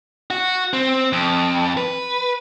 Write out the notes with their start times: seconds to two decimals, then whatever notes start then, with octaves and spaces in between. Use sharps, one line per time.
0.31 F#4
0.73 C4
1.12 F2
1.77 B4